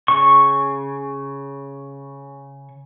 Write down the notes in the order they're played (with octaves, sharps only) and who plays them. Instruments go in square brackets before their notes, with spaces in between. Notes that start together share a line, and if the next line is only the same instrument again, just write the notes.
[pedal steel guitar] C#3 C#6